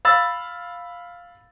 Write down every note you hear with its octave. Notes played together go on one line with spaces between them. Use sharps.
F5 B5 E6 A6